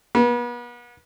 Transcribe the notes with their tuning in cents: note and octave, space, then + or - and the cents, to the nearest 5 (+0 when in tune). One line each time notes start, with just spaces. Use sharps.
B3 -35